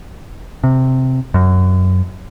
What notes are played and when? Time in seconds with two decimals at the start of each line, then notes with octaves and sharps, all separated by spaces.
0.64 C3
1.34 F#2